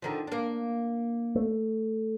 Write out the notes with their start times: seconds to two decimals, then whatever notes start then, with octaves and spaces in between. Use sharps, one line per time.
0.02 D3 D#3 F3
0.27 A#3 D4
1.35 A3